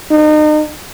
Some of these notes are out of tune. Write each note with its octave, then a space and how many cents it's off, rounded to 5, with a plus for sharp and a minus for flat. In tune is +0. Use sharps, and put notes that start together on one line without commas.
D#4 -35